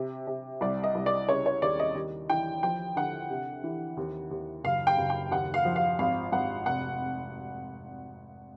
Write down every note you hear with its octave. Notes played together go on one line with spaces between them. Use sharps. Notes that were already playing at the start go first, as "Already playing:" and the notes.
Already playing: C3
C3
C2 D5
D#5
C2
D5
C#3 C#5
C#5
D#2 D5
D#5
D#2
E3 G5
F3 G5
D3 F#5
C3
E3
D#2
D#2
F#1 F5
G5
F#1
G5
D#2 F#5
F5
F3
F5
G#1 F5
G#1 F#5
F1 F#5